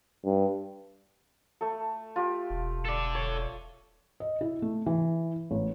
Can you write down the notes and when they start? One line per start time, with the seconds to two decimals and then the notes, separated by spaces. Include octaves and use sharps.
0.25 G2
1.61 A3 A4
2.16 F4 G4
2.50 E1
2.85 A4 D5
3.15 C#5
4.20 D#5
4.41 E4
4.62 A3
4.86 E3
5.51 A1